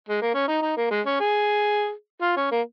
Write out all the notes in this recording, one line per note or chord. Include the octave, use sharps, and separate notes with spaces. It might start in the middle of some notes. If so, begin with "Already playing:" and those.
G#3
A#3
C#4
D#4
D#4
A#3
G#3
C#4
G#4
F4
C#4
A#3